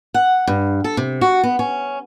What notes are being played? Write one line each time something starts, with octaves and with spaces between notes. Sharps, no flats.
F#5
G2
A4
C3
F#4
B3
C#4